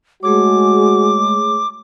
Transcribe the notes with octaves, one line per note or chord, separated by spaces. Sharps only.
G#3 A3 F#4 G#4 C#5 D6